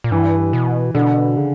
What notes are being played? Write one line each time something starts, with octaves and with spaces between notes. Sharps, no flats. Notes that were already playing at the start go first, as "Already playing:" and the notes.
A#2
G2 E3
B2
B2 D3
C#3